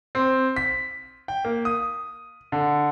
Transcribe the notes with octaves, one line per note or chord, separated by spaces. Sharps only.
C4
B6
G5
A#3
D#6
D3